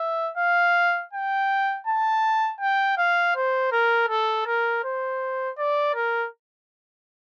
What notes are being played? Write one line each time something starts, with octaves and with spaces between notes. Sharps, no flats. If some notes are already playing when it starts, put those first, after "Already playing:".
Already playing: E5
F5
G5
A5
G5
F5
C5
A#4
A4
A#4
C5
D5
A#4